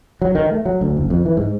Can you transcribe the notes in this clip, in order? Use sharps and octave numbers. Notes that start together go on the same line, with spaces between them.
F#3
D#3
A3
F#3
D2
F#1
F2
E3
G#2